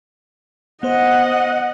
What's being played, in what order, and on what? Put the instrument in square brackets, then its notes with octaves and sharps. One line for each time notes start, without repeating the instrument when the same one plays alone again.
[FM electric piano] B3 C5 [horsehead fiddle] D#5 F#5